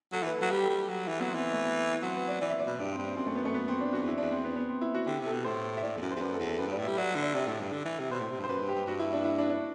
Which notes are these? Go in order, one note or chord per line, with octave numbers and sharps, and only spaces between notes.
F#3 A4
E3 B4
F#3 A4
G3 G4
A4
G3
F#3
E3
F#3 B3
C4
E3 B3
A3
B3
F#3 C4
B4
D5
E3 D5
E5
D5
B2
G2 D4
C4
G2
C4
F#2 C4
A3
B3
A3
B3
C4
D4
F#2 F#4
E2
E4
E2 D4
C4
B3
B3
C4
E4
F#4
D3 G4
C3
A4
B2
A2 C5
E5
A2 D5
E2
F#2
E2 C5
F#2 B4
A4
E2
A4
F#2 B4
G2 D5
A2
G3 E5
F#3 D5
E5
D3
D5
C3 D5
A2
G2
D3
E3
C3
B2 C5
A2
C3
G2
C5
F#2 B4
G2
G4
G2
G2 F#4
E4
D4
E4
D4
D4